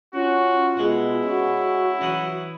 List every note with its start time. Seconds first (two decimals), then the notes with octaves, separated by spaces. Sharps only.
0.15 C#4 F4 F#4
0.77 B2 G#3 E4 F#5
1.24 C#4 F#4
2.01 E3 F#3 F#5 D#6